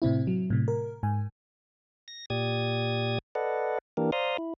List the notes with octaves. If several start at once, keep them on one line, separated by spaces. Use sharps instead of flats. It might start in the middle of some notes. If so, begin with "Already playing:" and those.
A2 C3 C4 E4
F#3
A2 C3
A#4
G#2 G#5
A#6
A#2 G4 D5 D#6 G#6
A4 B4 D5 D#5 F#5
E3 A#3 D4 G4 A#4
C5 D5 F5 A#5 C6 D#6
E4